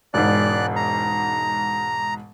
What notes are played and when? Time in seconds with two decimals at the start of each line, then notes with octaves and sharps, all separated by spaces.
0.14 E1 G#2 D5 F#6
0.76 A#5